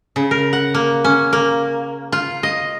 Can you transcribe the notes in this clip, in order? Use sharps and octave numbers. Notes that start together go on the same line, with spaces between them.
C#3
A#4
F#5
A#3
C#4
A#3
F4
D#5